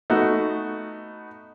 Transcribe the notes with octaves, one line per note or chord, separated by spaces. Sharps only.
A3 B3 D#4 F#4